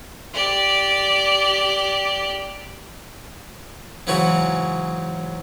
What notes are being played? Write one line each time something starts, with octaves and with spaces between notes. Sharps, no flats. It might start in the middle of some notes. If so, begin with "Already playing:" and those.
G4 D5
G#2 C#3 E3 F#3 F#4